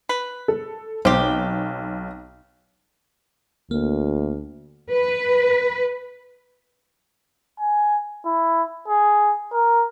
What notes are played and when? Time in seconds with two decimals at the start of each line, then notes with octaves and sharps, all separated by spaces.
0.09 B4
0.48 A4
1.05 B1 C4 G4
3.71 D2 A#3
4.90 B4
7.60 G#5
8.26 E4
8.88 G#4
9.54 A#4